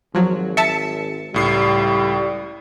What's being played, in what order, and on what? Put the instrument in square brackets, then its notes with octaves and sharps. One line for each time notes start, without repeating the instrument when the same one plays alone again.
[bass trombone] G#1 [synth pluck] F3 F#3
[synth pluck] E5 A5 [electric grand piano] C#7
[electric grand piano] C#2 A2 C7 [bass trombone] G3